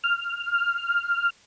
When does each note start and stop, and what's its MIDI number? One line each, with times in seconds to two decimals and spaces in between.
0.04 1.30 89